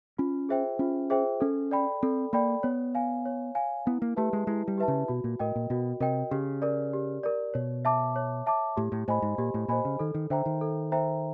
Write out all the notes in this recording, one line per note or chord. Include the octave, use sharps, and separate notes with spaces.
C#4 F4
G#4 C5 E5 G5
C#4 F4
G#4 C5 E5 G5
C#4 A4
D5 G5 B5
C4 A4
A#3 D5 G5 B5
B3 C#5
F5 G#5
C#5
F5 G#5
B3 E4
A#3
A3 G4 B4 E5 A5
G#3
G#3 E4
G3
G4 B4 E5 A5
C#3
B2 F#4
A#2
A2 A#4 D#5 G5
A#2
B2 F#4
C3 A#4 D#5 G5
C#3 G4
A#4 D5
G4
A#4 D5
B2 C#5
E5 A5 D6
C#5
E5 A5 D6
A2 G4
A2
A2 C5 D#5 G#5 B5
G#2
A#2 G4
A2
A#2 C5 D#5 G#5 B5
C#3
D#3 A4
D#3
D3 C5 E5 G5 A#5
D#3
A4
C5 E5 G5 A#5